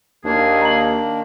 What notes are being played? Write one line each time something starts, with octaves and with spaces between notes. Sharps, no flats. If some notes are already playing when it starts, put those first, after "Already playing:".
D#2 D#3 A#3 D4 G#4
A#5 F#7